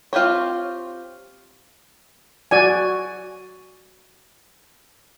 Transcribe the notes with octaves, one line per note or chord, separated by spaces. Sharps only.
C4 F4 G4 C5 C#5
F#4 D5 G#5